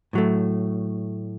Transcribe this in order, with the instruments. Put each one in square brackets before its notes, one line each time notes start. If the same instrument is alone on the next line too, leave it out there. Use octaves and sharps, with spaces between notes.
[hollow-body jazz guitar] A2 F#3 A3